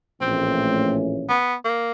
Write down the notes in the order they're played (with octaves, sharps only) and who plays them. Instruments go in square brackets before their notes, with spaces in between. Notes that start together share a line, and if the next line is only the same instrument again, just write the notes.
[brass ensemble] A#1 A2 E3 A3 C#4 [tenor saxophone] C4
[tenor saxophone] B3
A#3